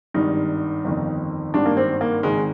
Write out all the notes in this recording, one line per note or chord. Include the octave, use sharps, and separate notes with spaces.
G#1 G2 D#3 D#4
G1 F2 D#3
G#1 G2 D#3 D4
A#3
C4
A#3
G#1 G#2 D#3 G#3